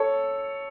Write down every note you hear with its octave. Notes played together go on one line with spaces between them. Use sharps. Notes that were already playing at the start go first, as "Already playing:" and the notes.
Already playing: A4 C#5